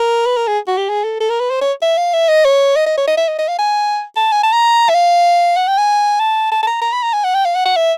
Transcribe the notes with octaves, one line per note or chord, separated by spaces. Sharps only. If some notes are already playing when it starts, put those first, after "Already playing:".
Already playing: A#4
B4
A#4
G#4
F#4
G4
G#4
A4
A4
A#4
B4
C5
C#5
E5
F5
E5
D#5
C#5
D#5
D#5
C#5
D#5
E5
D#5
D#5
F5
G#5
A5
G#5
A5
A#5
E5
F5
F#5
G5
G#5
A5
A5
A5
A#5
A#5
B5
A#5
G#5
F#5
G5
F5
F#5
F#5
E5